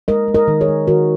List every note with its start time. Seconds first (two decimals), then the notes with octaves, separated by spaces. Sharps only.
0.08 G#3 A#4 D#5
0.28 G#3
0.34 A#4 D#5
0.48 D#3
0.61 G#4 C#5
0.68 G#3
0.87 D#3 F#4 A#4